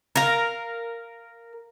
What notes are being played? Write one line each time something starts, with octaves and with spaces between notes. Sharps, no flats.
A#4 F5